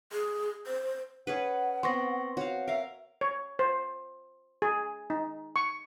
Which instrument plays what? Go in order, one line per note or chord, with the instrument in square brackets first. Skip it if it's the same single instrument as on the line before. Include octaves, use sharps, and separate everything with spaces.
[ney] G#4
C5
[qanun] C#4 G#4 B4 [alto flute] F#5
[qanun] B3 C4 [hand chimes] C6 C#6 A#6
[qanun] F#4 F5 [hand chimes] C#5
[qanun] A#4 F5 [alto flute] E5
[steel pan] C#5
C5
G#4
D#4
C#6